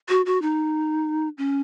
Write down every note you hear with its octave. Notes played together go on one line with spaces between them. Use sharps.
F#4
F#4
D#4
C#4